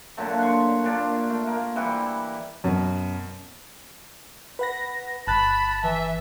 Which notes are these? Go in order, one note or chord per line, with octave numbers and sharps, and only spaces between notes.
A#2 D3 F#3 A3
F#5 C6 C#6
A#2 D4 F4
A3
A#3
E3 G3 E4 F#5
F#2 B2
B4 F#5 A#6
G1 A5 B5 F#6 A6
E3 E5